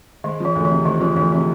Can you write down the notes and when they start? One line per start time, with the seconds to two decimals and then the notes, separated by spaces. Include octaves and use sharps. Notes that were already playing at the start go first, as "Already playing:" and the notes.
0.24 D#3 G#3
0.40 E3 F3
0.55 D2
0.65 E3
0.70 C3
0.85 D#3 G#3
1.00 E3 F3
1.16 D2 E3
1.32 C3 E3